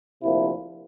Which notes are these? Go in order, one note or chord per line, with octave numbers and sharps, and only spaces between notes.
D2 C3 F3 A#3 E4